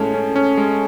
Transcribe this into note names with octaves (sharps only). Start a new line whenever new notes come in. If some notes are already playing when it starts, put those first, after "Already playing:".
Already playing: A2 G#3 C#4 A4
C#4
C#4
G#3